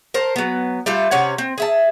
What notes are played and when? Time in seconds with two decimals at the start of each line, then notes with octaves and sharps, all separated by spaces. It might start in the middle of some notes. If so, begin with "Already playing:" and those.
0.14 A#4 C5 A5
0.36 F#3 B3
0.86 G3 A3 F4 A4
1.11 C3 C#4 C#5 F#5
1.38 C4
1.58 G#4 E5 A5